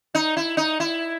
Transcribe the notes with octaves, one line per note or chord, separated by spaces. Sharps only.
D#4
E4
D#4
E4